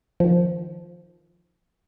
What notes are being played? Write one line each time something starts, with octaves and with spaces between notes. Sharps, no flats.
D#3 F3